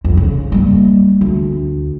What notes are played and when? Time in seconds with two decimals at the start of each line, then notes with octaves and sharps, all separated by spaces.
0.04 F2
0.17 C#3
0.52 G3 A#3
1.21 D2